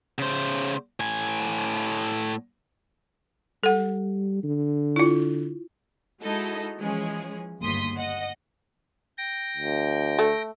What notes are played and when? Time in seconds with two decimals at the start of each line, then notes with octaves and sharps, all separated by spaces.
0.19 C#3 C5
1.00 A2 G#5
3.63 G3 A4 F#5
4.44 D3
4.96 E4 F4
6.20 G#3 D#4 E4 F#4 A4 D#5
6.77 E3 F3 G#3 C#4 G#4
7.60 G1 D#2 G#2 C6 D#6 B6
7.97 D#5 F#5
9.18 G5 A#6
9.57 D2
10.19 A3